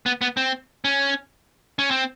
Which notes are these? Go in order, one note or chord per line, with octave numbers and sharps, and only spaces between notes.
B3
B3
C4
C#4
C#4
C4